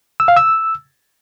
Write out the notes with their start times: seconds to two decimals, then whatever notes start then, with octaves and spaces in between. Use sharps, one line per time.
0.20 E6
0.28 F5
0.37 E6